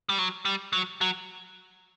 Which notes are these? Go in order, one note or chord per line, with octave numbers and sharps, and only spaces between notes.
G3
F#3
G3
F#3
F#3